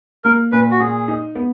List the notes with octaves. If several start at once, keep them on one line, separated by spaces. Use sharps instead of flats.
A#3 A#4
A#2 B4
F#4
A#2 G#4
D#4
B3